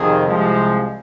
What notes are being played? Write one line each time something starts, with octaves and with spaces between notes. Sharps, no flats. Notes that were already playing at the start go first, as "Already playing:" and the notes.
Already playing: F2 C3 D#3 G#4
C2 C3 F3 G#3